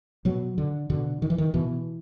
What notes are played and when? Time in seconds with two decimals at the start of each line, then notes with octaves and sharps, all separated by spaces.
0.25 B2 F#3
0.58 D3
0.90 B2 D3
1.22 D#3
1.30 E3
1.38 D#3
1.54 B2 E3